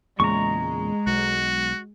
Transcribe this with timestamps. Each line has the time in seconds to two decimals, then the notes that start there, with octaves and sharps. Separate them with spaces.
0.20 E2 A#2 C#3 G#3 A#5 C#6
1.07 B1 F#4